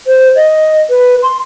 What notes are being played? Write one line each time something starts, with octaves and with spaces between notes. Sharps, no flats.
C5
D#5
B4
C6